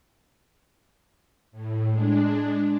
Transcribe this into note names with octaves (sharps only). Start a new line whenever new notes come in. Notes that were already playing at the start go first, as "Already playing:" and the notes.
A2
G#3 D4